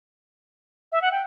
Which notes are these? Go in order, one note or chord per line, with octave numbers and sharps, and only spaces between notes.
E5
F#5
G5